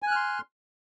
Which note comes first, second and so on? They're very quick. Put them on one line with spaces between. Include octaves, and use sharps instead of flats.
G#5 F#6 F6 C6